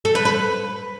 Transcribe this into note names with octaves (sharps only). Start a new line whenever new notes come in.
A4
B4
B4